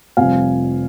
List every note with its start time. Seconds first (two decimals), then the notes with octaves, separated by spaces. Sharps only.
0.17 F1 F2 C3 G3 F5 G#5